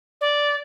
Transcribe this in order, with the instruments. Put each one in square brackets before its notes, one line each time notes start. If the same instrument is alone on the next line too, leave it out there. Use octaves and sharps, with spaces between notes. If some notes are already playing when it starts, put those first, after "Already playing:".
[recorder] D5